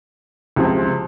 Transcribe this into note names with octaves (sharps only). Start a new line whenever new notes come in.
C#2 C3 F3 C4